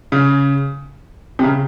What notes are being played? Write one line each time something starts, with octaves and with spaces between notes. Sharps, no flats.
C#3
C3
C#3